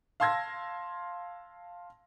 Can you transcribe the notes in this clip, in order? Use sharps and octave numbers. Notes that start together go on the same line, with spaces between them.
F5 A5 C6 E6 G#6 A#6